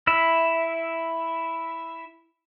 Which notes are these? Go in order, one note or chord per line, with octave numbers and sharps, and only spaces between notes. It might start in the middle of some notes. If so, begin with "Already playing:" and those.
E4 E5